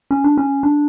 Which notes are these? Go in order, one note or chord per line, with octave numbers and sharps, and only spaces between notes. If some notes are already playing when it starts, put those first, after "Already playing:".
C#4
D4
C#4
D4